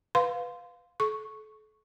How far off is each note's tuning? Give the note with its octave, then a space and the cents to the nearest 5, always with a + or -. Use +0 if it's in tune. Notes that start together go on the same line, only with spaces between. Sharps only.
B4 +5 F5 +15 C6 -25
A4 -35 C#6 +0